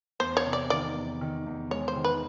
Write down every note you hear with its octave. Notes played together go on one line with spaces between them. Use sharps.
E2 C5
C#5
C3
D5
D#3 D5
E2
D#3
E2
G#3 C#5
C5
D#3
B4